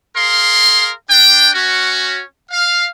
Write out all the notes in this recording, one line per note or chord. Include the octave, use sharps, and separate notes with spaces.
G#4 A#4 F5 C6
D4 G5
C#4 F#4
F5